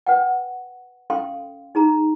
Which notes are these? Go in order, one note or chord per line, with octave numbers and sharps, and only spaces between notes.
B4 F#5 G5
C#4 A4 F5 G5 C6
D#4 G#4 A#5